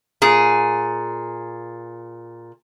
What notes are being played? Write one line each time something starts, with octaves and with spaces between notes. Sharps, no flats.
A#2 G#4